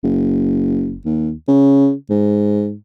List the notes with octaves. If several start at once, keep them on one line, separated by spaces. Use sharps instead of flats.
F#1
D#2
C#3
G#2